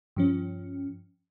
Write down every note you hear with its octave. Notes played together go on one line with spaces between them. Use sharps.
G2 F3 C#4